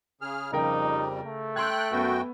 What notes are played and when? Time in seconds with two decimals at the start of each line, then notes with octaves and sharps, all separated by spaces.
0.21 C#3 G#4 F6
0.53 F2 C#3 G3 D#4 A#4 G5
1.24 A3
1.56 G5 C6 E6 F#6 G#6
1.92 F#2 B3 F#4 G5